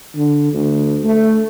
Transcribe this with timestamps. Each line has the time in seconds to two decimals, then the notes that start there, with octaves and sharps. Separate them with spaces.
0.15 D3
0.53 D2
1.04 A3